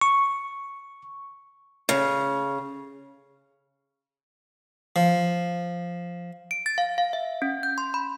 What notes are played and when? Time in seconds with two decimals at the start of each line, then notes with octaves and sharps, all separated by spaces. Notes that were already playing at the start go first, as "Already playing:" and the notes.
0.01 C#6
1.89 C#3
4.96 F3
6.51 D7
6.66 A6
6.78 F5
6.98 F5
7.13 E5
7.42 C#4
7.63 G6
7.78 C6
7.94 B5